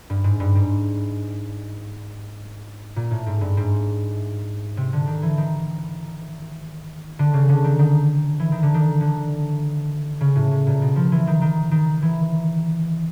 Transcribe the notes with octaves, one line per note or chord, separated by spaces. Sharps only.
G2
G#2
G2
G#2
A#2
A2
G#2
G2
G#2
C3
D3
D#3
E3
D#3
D3
C#3
D3
D#3
D#3
E3
D#3
D3
D#3
D3
C#3
A2
A2
A#2
B2
F3
E3
D#3
D#3
D#3
E3